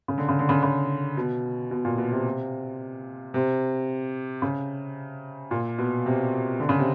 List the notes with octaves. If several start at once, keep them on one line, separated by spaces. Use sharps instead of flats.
C#3
D3
C#3
D3
C#3
C#3
B2
B2
A#2
B2
C3
C3
C#3
A#2
B2
C3
D3
C#3
C3